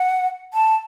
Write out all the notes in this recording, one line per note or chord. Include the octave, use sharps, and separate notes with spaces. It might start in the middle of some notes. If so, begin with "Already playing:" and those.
Already playing: F#5
A5